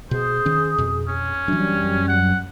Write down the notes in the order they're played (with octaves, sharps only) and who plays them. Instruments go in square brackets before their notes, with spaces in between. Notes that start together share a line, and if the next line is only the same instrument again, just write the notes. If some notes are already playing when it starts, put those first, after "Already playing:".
[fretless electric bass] B2 [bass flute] G#4 [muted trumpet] C5
[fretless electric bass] D#3 C#4
F2 B2
[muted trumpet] C#4
[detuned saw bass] F#2 [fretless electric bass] E3 D4 [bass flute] G3
[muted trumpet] F#5